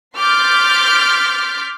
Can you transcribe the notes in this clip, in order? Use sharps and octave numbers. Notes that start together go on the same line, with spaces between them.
C6 D6 F6 G6 A6 B6